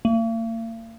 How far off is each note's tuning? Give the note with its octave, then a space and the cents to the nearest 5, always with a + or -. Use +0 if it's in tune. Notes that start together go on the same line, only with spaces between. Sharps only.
A#3 -45